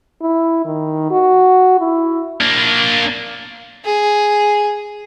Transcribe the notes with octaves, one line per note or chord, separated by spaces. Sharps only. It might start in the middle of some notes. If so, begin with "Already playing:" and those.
E4
D#3
F#4
E4
A#3 D4
G#4